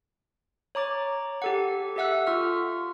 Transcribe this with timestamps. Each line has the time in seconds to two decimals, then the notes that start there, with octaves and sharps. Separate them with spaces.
0.75 C#5 A#5 D6 A6
1.42 G4 A4 F#5
1.96 G4 A4 E5 F#5 E6 F#6
2.27 F4 C#6 F6